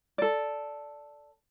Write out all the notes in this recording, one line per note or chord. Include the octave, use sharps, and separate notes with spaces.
A4 D5